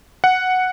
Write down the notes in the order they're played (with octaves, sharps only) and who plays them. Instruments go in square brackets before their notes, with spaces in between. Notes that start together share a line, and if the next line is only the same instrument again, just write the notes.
[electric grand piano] F#5